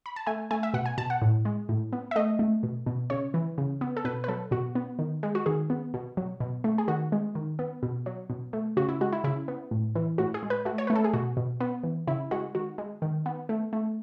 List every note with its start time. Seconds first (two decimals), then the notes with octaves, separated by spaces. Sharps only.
0.06 B5
0.16 A5
0.27 A3 G#5
0.51 A3 G#5
0.63 E5
0.74 B2 F#5
0.86 G#5
0.98 B2 A5
1.10 F#5
1.22 A2
1.45 G#3
1.69 A2
1.93 B3
2.11 E5
2.16 A3 D#5
2.39 A3
2.63 B2
2.86 B2
3.10 C#3 C#5
3.34 E3
3.58 C#3
3.81 B3
3.97 A4
4.05 B2 B4
4.24 B4
4.28 F#3 A4
4.51 B2 F#4
4.75 B3
4.99 D#3
5.23 G#3
5.35 F#4
5.46 D#3 G#4
5.70 B3
5.94 B2
6.17 F#3
6.40 B2
6.64 A3
6.78 G#4
6.88 D#3 F#4
7.12 G#3
7.35 D#3
7.59 B3
7.83 B2
8.06 F#3
8.30 B2
8.53 A3
8.77 C#3 F#4
8.89 E4
9.01 G#3 F#4
9.13 E4
9.24 C#3 E4
9.48 B3
9.71 A2
9.95 E3
10.18 A2 F#4
10.34 G#4
10.43 G#3
10.50 B4
10.65 A3 F#4
10.78 C#5
10.87 A3 B4
10.95 A4
11.04 G#4
11.13 B2 F#4
11.37 B2
11.60 B3
11.83 E3
12.07 C#3 E4
12.31 G#3 F#4
12.55 D#3 F#4
12.78 G#3
13.02 D#3
13.26 B3
13.49 A3
13.73 A3